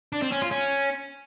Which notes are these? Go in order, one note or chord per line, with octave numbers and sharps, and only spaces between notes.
D4
C4
C#4
F4
C#4